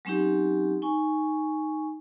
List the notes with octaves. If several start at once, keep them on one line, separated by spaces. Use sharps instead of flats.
F#3 G#3 C4 C#4 D#4 G4
D#4 G#5 C#6